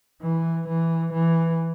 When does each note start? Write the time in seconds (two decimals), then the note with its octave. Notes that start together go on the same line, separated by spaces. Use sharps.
0.22 E3
0.68 E3
1.13 E3